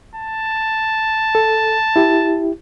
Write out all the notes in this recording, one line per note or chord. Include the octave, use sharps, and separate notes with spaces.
A5
A4
E4 G4